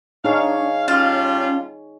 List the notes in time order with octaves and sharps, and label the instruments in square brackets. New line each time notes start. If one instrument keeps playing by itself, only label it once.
[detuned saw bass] D4 [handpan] D#4 G#4 C#5 [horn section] F5
[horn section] G3 F4 [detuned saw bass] C#4 [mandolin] F5 A5